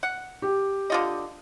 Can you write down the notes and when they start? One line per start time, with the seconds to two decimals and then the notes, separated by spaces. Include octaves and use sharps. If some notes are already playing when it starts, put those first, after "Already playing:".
0.03 F#5
0.42 G4
0.90 D3 F4 D#5